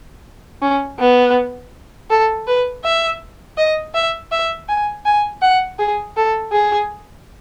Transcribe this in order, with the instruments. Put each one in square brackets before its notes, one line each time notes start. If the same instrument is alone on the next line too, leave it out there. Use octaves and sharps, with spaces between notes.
[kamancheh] C#4
B3
A4
B4
E5
D#5
E5
E5
G#5
G#5
F#5
G#4
A4
G#4